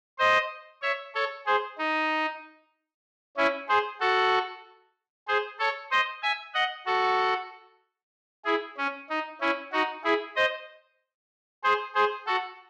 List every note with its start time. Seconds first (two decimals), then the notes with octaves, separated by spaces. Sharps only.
0.18 C5 D#5
0.82 C#5 E5
1.15 A4 C#5
1.46 G#4 C5
1.79 D#4
3.37 C#4 E4
3.69 G#4 C5
4.01 F#4 A4
5.28 G#4 C5
5.59 A4 C#5
5.91 C5 D#5
6.23 E5 G#5
6.54 D#5 F#5
6.86 F#4 A4
8.45 E4 G#4
8.78 C#4
9.10 D#4
9.41 C#4 E4
9.72 D#4 F#4
10.04 E4 G#4
10.36 C5 D#5
11.64 G#4 C5
11.95 G#4 C5
12.27 F#4 A4